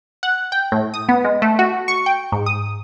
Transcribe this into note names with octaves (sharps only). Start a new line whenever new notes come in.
F#5
G5
A2
D#6
B3
G#3
A3
F#4
C#6
G5
G#2
D#6